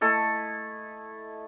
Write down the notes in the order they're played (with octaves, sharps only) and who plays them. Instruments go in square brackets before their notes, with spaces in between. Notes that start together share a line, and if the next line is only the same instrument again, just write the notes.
[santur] A3 E4 A4 D#5